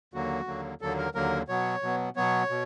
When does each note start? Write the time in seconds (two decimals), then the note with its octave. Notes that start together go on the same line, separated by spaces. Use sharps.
0.14 D#2 D3 F#3 A#3 F#4
0.47 D#2 D3 F#3 A#3
0.81 D#2 D3 F#3 A#3 A4
0.98 A#4
1.15 D#2 D3 F#3 A#3 A#4
1.48 B2 F#3 B3 C#5
1.83 B2 F#3 B3
2.16 B2 F#3 B3 C#5
2.50 B2